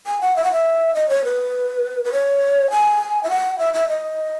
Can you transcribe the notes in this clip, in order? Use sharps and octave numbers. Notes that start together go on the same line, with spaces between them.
G#5
F#5
E5
F#5
E5
D#5
C#5
B4
B4
C#5
G#5
E5
F#5
E5
E5
D#5